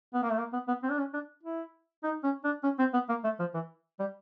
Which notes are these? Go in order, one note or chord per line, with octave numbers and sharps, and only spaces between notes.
B3
A#3
A3
A#3
B3
B3
C4
D4
C#4
D4
E4
D#4
C#4
D4
C#4
C4
B3
A#3
A3
F3
E3
G3